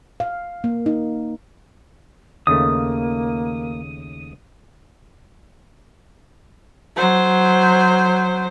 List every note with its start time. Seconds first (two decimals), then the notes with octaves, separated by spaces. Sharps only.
0.20 F5
0.64 A#3
0.86 D#4
2.47 D#2 C#3 A3 A#3 D#6
6.96 F#3 C5